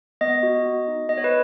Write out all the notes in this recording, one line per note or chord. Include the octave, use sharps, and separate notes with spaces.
B3 D#5
F#4
B3
D#4
B3 D#5
C#5
B4